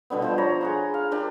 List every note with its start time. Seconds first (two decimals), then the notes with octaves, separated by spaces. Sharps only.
0.10 B2 D3 G3 B3
0.22 F3 C5 C6
0.38 C#5 A#5 B5
0.61 G#4 F#5 C6
0.94 F5
1.11 D4 G4 A#4 C5